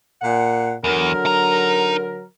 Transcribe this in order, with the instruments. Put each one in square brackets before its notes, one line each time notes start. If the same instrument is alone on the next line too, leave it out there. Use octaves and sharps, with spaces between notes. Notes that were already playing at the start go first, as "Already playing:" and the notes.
[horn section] A#2 F#5
[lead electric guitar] E2 [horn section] D3 F#3 A#4
[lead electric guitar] D#4 A#5